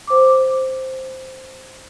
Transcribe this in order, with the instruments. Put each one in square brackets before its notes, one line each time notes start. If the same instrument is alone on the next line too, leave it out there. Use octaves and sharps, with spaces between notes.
[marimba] C5 D6